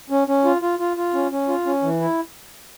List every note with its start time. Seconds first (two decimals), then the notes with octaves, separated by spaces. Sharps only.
0.10 C#4
0.28 C#4
0.45 F4
0.62 F4
0.79 F4
0.97 F4
1.14 C#4
1.32 C#4
1.48 F4
1.66 C#4
1.83 E3
2.00 E4